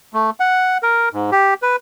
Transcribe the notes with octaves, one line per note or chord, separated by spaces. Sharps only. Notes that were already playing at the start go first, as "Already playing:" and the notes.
A3
F#5
A#4
G#2
G4
B4